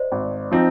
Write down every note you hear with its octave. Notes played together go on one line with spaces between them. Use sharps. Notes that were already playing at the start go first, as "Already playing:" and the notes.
Already playing: C5 D5 D#5
G#1
F3 C4 D#4